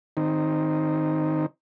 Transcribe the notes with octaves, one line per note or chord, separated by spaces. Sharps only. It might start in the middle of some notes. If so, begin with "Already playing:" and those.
D#3 C4 D#4